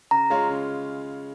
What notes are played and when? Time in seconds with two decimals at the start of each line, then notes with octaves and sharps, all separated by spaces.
0.11 C#3 A#5
0.30 G#3 F4 C#5
0.50 C#3